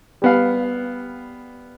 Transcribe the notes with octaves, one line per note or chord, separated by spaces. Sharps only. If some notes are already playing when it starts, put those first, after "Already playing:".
G3 B3 F5